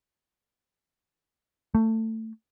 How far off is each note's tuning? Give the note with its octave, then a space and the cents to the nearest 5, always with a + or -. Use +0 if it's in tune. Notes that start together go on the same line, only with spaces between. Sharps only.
A3 +20